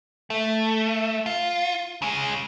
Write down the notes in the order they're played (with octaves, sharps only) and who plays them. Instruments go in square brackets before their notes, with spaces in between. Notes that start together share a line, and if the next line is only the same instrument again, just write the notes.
[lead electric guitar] A3
F4
C#3 G#3